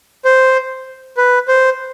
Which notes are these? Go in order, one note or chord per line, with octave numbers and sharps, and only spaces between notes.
C5
B4
C5